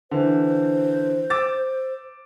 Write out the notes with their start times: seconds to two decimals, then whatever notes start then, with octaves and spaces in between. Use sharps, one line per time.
0.11 D3 E3 C5
1.30 D6 E6 A6